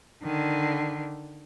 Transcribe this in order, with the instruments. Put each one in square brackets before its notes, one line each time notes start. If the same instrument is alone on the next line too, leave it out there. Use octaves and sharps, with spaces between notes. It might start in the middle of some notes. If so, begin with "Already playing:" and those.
[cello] D3 D#3